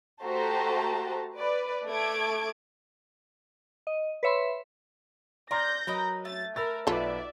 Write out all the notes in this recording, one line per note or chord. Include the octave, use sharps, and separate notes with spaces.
A3 F#4 G4 C5 A5 A#5
B4 D5
A3 A5 D6 G#6 D7
D#5
B4 C#5 E5 B5 C6
A#4 D5 C6 F6 G6 A#6
F#3 A#4 B4 D#5
A3 A6
A#4 B5 E6 A6
B1 F4 A4 B4 D5 E5